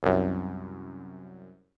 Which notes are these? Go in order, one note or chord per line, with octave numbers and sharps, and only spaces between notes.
C2 F#2